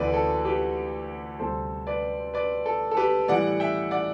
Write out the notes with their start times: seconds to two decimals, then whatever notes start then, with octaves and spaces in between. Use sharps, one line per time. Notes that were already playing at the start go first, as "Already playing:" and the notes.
Already playing: D2 C3 E3 A3 B4 D5
0.14 A4
0.45 G4 B4
1.39 D2 C3 G3 A4 C5
1.87 B4 D5
2.34 B4 D5
2.66 A4
2.91 A4
2.97 G4 B4
3.28 A2 E3 G3 D5 F#5
3.60 E5 G5
3.91 D5 F#5